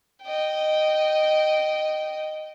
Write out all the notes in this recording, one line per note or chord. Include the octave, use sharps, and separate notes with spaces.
D#5 G5